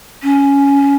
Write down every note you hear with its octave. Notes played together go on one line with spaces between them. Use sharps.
C#4